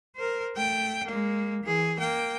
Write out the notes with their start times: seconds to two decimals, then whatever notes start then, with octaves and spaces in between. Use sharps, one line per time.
0.16 A#4 C5
0.56 A3 G5
1.06 G#3 A#3
1.63 E3 G#4
1.99 A#3 G5